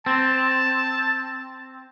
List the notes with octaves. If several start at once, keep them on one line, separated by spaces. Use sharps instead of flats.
C4 A5